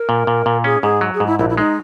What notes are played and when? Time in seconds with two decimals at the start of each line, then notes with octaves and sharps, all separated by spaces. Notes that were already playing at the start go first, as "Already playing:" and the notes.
Already playing: A#4
0.09 A#2
0.27 A#2
0.46 A#2
0.64 C#4 G#4
0.82 G#2 G#4
1.01 F#3
1.14 G#4
1.20 G#2
1.26 E4
1.39 A#1 E4
1.49 E4
1.57 G#3 D#4